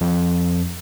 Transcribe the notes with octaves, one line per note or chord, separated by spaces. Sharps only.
F2